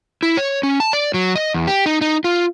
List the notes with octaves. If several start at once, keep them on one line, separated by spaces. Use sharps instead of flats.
E4
C#5
C#4
A5
D5
F#3
D#5
E2
G4
D#4
D#4
F4